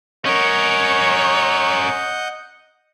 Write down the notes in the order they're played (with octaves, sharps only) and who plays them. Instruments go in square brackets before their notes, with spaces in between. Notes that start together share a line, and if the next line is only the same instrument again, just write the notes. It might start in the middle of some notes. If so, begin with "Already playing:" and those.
[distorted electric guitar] C#4 A#4 [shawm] C#5 [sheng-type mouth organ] D#5 F#5 G6